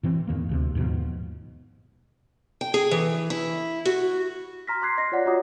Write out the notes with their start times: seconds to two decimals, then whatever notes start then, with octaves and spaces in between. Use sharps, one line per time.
0.03 A2 E3 C4
0.27 E2 D#3 A#3
0.49 D2 C3
0.75 D#2 G#2 B2 F3
2.61 G5
2.74 G#4
2.91 E3
3.30 E4
3.85 F#4
4.67 A#5 C6 F6 A#6 B6
4.82 C6 D6 F#6 G#6 C7
4.98 D#5 A#6 C7
5.12 F4 C#5 D5 F#5
5.26 F4 F#4 C#5 A#5 D6 D#6